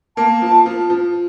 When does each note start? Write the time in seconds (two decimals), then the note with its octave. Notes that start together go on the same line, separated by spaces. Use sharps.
0.16 A#3 A5
0.42 F3
0.66 F3
0.90 F3